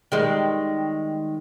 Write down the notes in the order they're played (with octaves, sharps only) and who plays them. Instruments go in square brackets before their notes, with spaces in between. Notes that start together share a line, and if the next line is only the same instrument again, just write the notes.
[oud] D#3 G3 G#3